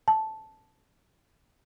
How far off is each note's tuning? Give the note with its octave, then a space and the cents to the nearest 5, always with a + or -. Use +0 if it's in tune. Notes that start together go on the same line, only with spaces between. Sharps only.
A5 -5